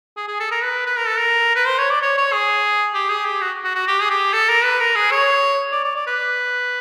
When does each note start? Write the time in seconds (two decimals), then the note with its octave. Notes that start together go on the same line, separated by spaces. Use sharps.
0.17 G#4
0.28 G#4
0.40 A4
0.51 A#4
0.63 B4
0.86 B4
0.97 A#4
1.08 A4
1.18 A#4
1.55 B4
1.67 C5
1.79 C#5
1.90 D5
2.02 C#5
2.18 C#5
2.33 G#4
2.94 G4
3.10 G#4
3.25 G4
3.41 F#4
3.64 F#4
3.75 F#4
3.87 G4
4.02 G#4
4.10 G4
4.33 A4
4.49 A#4
4.64 B4
4.80 A#4
4.95 G#4
5.11 C#5
5.72 D5
5.84 D5
5.96 D5
6.07 B4